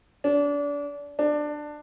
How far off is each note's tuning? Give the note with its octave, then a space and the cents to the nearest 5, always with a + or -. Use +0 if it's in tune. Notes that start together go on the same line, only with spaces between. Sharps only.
D4 -30
D4 +15